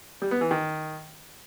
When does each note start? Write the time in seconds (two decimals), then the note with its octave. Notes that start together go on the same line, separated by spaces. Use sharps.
0.22 G3
0.31 B3
0.41 E3
0.51 D#3